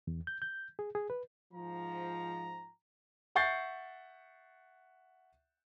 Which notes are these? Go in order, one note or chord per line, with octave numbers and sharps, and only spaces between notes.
E2
G6
G6
G#4
G#4
B4
G#2 F3 A#5
E5 F#5 C#6 G6 A6 C7